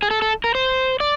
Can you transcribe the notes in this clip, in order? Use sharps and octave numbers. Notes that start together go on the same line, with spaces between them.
G#4
A4
A4
A#4
C5
D5